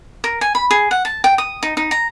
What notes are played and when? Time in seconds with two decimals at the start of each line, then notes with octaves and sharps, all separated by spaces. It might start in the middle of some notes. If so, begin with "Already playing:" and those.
0.24 A#4
0.41 G#5
0.55 B5
0.71 G#4
0.91 F#5
1.05 A5
1.24 G5
1.38 D#6
1.63 D#4
1.77 D#4
1.91 A#5